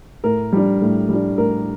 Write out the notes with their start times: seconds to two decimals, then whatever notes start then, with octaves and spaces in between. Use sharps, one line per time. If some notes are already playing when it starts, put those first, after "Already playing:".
0.24 A2 A#4
0.52 G3 D4
0.81 A2
1.09 G3 D4
1.38 A2 A#4